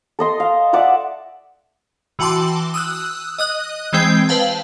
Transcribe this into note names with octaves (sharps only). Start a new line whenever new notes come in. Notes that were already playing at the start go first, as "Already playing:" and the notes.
A4 D#5 C6
F5
D5 E5 F#5 A5
E3 F#4 G5 A5 C6 D6
D#6 E6 F#6
D#5 D#6 F#6
E3 G#3 C4 G5
B4 C5 F5 A5